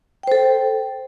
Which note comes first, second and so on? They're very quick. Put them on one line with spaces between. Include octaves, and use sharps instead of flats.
G5 C5 A4